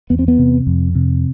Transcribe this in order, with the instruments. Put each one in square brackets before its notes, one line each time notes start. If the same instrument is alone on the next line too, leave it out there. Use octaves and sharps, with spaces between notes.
[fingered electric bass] E2 B3
C4
B3
C3
F2
C3